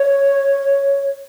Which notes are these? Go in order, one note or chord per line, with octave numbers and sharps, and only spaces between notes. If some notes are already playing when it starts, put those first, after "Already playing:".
Already playing: C#5